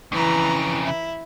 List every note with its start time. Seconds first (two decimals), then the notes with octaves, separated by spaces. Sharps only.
0.12 F2 C#3 E3 A#5
0.83 E4